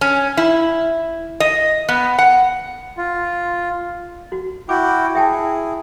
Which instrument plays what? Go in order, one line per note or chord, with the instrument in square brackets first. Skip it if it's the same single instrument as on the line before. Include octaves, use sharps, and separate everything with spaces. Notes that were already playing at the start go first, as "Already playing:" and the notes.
[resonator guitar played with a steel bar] C#4
E4
D#5
B3
F#5
[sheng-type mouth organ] F4
[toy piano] F#4
[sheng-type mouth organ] E4 F#4 G5 [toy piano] D6
[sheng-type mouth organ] E4 G#4 [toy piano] E5 G5 A5